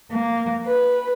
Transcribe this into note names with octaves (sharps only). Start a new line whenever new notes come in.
A#3
B4